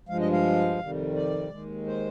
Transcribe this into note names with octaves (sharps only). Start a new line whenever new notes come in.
G2 F3 G#3 F5
D#5
F5
F2 C3 D#3 G3
D5
D#2 D#3 G#3
C5